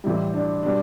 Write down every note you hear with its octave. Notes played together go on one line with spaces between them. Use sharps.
A1 A2 G3 E4
D4
B2 G3 D4